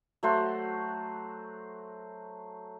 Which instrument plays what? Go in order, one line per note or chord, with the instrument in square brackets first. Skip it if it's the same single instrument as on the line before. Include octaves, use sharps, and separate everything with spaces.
[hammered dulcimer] F#3 A3 C5 F#5